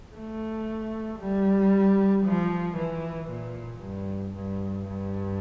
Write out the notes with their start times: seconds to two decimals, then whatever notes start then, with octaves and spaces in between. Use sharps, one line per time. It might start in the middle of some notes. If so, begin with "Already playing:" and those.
0.15 A3
1.19 G3
2.25 F3
2.76 E3
3.29 A#2
3.81 G2
4.34 G2
4.88 G2